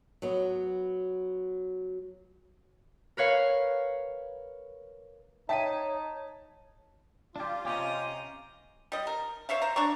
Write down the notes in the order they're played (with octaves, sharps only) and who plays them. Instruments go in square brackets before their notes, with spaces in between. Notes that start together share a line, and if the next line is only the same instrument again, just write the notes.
[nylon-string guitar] F#3 B3
[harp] A#4 B4 C#5 F5
[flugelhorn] D#4 [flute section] C#5 [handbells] E5 G5 [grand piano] A5 B6 D#7
[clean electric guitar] D4 G4 [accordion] F4
[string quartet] C3 D#5 A#5 [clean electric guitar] C#4 G4
[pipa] G3 D#5
A#4
C5 C#5 E5 F5
C5 A#5
D4 D5 A#5 C#6